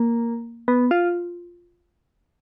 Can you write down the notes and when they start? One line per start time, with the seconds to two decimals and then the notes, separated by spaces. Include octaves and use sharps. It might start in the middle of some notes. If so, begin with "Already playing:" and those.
Already playing: A#3
0.68 B3
0.91 F4